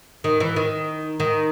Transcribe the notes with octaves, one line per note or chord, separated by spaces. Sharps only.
D#3
E3
D#3
D#3